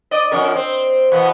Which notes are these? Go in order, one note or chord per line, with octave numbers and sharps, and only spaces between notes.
D5 D#5
F2 C#4 A#4
C4
E2 B2 B3